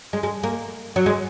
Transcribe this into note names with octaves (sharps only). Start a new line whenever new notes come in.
G#3
G#3
A#3
F#3
G#3